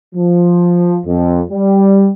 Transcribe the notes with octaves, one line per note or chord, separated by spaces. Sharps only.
F3
F2
G3